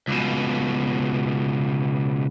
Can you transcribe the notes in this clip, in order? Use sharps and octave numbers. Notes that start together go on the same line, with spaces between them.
C#2 B2